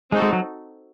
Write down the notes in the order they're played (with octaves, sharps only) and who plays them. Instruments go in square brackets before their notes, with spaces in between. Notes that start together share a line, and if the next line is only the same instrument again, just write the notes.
[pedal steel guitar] G#3 [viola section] C4 D#4 F#4 A4
[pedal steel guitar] G#3
F#3